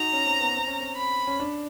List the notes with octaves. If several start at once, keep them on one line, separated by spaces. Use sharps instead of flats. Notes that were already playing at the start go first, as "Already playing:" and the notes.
Already playing: D#4 F#4 A#5
C#4
C4
B3
C4
C#4
C4
B5
C#4
D4